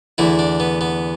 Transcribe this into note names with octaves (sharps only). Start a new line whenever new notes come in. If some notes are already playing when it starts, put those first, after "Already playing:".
E2 D3 A3 E4
D4
B3
B3